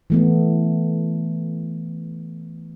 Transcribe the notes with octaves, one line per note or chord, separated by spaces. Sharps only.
E3 A3 B3